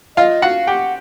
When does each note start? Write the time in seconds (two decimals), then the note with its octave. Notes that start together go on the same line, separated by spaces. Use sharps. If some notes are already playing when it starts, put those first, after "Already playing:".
0.17 F4 D#5 F5
0.42 F#4 F5 F#5
0.67 G4 F#5 G5